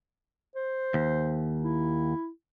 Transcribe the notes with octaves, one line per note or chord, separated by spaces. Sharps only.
C5
D#2
E4